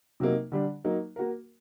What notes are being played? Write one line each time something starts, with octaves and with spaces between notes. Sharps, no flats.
C3 F#3 A#3 D#4
D3 G3 D4
F#3 A#3 D#4
A#3 F#4 A#4